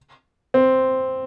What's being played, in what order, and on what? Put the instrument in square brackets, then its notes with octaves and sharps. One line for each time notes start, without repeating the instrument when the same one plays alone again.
[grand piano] C4